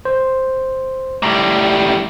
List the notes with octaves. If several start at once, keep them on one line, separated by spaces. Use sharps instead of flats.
C5
A2 G3 A#5